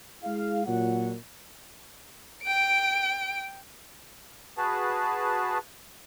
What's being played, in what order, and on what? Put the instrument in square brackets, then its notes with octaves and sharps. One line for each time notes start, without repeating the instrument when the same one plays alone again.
[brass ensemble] G#3 E4 G#4 F5
A#2 F#3 F#5
[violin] G5 D7
[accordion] F#4 G#4 B4 A5